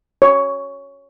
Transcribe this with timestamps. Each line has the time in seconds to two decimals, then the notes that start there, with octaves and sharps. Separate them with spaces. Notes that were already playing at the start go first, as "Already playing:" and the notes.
0.22 C#5